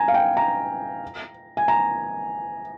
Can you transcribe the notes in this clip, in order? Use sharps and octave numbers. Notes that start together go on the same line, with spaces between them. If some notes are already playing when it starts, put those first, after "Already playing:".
Already playing: G#5 A#5
F5
G5
A#5
G#5
A#5